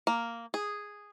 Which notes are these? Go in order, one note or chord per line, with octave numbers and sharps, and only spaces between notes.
A#3
G#4